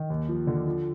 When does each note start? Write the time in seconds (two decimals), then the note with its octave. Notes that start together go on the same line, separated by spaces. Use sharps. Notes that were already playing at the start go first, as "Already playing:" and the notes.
Already playing: D#3
0.10 D#2
0.29 F3
0.47 D3
0.67 F3